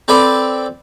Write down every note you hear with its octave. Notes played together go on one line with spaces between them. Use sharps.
C4 A4 B4 D5